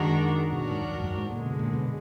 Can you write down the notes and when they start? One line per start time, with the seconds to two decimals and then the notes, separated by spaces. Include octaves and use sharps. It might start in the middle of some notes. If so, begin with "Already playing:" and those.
Already playing: F#2 D#3 G#3 D4 F#4 A#4
0.48 B2 D#3 F#3 D4 F#4 A#4
0.62 A#2
0.71 G#2
0.81 F#2
0.90 F2
0.99 G#2
1.04 F#2
1.18 G#2
1.31 F#2 A#2 D3 G#3
1.46 B2
1.59 A#2
1.73 B2